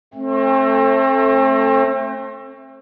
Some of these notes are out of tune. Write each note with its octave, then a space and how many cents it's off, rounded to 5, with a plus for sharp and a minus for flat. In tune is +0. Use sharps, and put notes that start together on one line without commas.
A3 +0 C4 +35